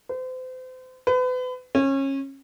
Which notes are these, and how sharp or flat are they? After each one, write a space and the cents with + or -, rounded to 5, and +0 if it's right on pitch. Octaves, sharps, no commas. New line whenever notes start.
C5 -35
B4 +35
C#4 -25